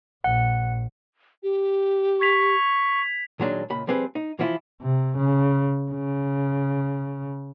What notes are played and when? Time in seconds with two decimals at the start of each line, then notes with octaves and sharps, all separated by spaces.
0.24 A#1 F#5
1.43 G4
2.21 C#6 G#6 B6 F7
3.39 A#2 D#3 F#3 G#3 D4
3.70 C#2 A#2 B5
3.87 F3 G3 C4 G#4 B4
4.15 D#4
4.39 E3 F3 E4 F4
4.82 C3
5.18 C#3
5.91 C#3